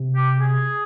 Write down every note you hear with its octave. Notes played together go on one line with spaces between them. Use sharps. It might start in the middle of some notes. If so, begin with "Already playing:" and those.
Already playing: C3
G4
G#4